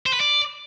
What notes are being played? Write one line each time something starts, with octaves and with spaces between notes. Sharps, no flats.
C5
B4
D5